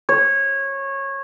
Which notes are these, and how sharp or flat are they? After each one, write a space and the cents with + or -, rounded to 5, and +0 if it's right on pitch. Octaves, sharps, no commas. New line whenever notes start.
C#5 -20